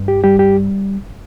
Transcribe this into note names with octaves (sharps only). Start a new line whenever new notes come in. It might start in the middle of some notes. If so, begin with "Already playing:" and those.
Already playing: G2
G4
G3 G4
G4